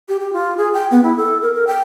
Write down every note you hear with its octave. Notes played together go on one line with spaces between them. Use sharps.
G4
G4
F4
G#4
G5
B3
E4
A4
A#4
A#4
G5